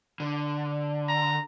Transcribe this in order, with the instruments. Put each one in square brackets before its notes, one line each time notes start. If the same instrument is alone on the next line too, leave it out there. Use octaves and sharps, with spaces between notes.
[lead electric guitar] D3
[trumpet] A#5